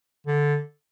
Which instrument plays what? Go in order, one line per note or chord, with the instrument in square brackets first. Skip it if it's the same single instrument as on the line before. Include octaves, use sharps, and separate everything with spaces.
[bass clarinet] D3